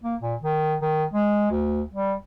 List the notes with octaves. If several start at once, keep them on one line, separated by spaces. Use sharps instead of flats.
A#3
A#2
D#3
D#3
G#3
D2
G3